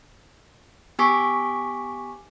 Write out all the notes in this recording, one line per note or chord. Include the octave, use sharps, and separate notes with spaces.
B3 G4 G#5 C#6 D6 B6